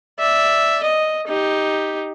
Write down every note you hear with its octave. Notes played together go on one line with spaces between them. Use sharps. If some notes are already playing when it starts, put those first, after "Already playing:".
D5 E5
D#5
D#4 G4